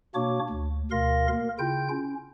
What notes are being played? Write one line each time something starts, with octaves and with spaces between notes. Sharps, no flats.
B2 A#3 D4 F#4 C#5 D6
D2
D2 B2 A#4 F5 C6 A#6
A#3 A#4
C#3 E4 F4 G5 G6
C#4